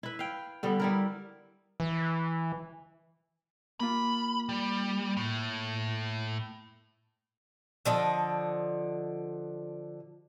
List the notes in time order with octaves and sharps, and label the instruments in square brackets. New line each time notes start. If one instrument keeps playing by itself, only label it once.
[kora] E4 B4
F5 G5
D3 G3 B3
G3 E4 A#4
[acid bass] E3
[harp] A#3 F4 [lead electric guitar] B5
[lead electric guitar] G3
A2
[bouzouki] D3 F3 D#5